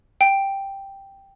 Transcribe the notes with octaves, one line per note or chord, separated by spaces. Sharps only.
G5